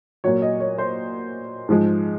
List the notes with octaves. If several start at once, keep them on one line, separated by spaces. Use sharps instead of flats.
A#2 F#3 C#5
D#5
C#5
C5
G#2 F3 G#3